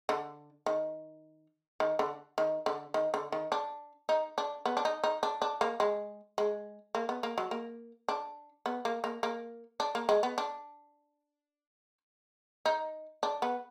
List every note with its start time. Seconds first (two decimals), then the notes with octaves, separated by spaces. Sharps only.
0.09 D3
0.66 D#3
1.80 D#3
1.99 D3
2.38 D#3
2.66 D3
2.94 D#3
3.14 D3
3.32 D#3
3.52 D4
4.09 D#4
4.38 D4
4.66 B3
4.77 D4
4.85 D#4
5.04 D#4
5.23 D4
5.42 D4
5.61 A#3
5.80 G#3
6.38 G#3
6.95 A#3
7.09 B3
7.23 A#3
7.38 F#3
7.51 A#3
8.09 D4
8.66 B3
8.85 A#3
9.04 A#3
9.23 A#3
9.80 D4
9.95 A#3
10.09 G#3
10.23 B3
10.38 D4
12.66 D#4
13.23 D4
13.42 B3